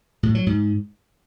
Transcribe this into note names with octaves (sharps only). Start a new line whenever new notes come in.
A2
F#3
G#2